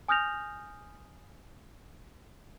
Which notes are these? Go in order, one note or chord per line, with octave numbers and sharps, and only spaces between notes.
G#5 D#6 F6 G6 A#6 F7